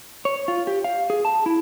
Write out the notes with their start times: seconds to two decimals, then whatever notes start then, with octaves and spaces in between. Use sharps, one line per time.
0.25 C#5
0.48 F4
0.67 G4
0.84 F5
1.10 G#4
1.25 A5
1.46 E4